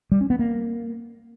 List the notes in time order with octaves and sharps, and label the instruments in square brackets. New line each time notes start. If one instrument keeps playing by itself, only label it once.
[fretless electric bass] G3
C#4
B3
A#3